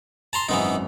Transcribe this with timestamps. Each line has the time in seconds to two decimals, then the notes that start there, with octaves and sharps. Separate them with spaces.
0.33 A5 A#5 C6
0.49 G#1 F#2 E3 B3 D#4